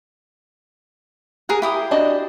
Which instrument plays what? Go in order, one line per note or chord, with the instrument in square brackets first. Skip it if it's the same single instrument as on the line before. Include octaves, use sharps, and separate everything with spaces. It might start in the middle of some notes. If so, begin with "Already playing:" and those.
[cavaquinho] G#4 A#4 F#5
E4 G4 D#6
[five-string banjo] D4 F#4 D#5